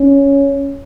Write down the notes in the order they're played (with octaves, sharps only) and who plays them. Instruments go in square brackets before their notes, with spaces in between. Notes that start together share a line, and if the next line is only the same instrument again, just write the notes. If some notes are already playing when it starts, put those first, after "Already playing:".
Already playing: [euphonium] C#4